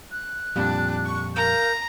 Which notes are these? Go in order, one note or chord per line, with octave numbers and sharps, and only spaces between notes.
F#6
F2 A#2 G3 D4
C#6
A#4 F5 A#5 G6